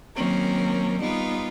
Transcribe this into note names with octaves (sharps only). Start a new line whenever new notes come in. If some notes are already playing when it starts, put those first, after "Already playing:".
D#3 F#3 A#3 C4 C#4 A#4
G3 B3 D#4 F4